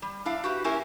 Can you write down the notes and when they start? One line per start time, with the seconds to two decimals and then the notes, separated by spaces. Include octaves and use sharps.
0.02 G3
0.26 D4 E4 F5
0.44 F#4 G4 B4
0.64 A#3 C#4 E4 G4 A#4 G#5